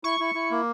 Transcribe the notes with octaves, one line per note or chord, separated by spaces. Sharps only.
E4 C#6
E4
E4
A#3